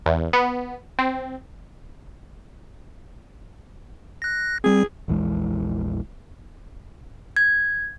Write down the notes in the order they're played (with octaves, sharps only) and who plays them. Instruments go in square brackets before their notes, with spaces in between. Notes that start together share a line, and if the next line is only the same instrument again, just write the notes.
[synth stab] E2
B3
C4
[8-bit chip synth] F#6 A#6
[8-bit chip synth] G3 C4 [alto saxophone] G#4
[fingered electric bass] A#1 E2 E3 G#3
[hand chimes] G#6